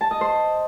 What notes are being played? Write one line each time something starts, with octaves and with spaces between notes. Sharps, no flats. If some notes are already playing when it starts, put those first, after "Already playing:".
A5
D#5
C5